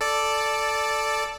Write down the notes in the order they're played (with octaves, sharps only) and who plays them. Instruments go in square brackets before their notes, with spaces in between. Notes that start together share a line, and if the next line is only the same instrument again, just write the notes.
[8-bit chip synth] A4 D5